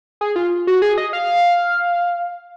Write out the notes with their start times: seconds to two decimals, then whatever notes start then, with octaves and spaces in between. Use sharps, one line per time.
0.21 G#4
0.36 F4
0.67 F#4
0.82 G#4
0.98 D#5
1.13 F5